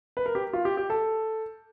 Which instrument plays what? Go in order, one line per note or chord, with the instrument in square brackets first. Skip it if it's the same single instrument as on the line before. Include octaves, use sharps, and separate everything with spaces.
[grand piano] B4
A#4
G4
F4
G4
G4
A4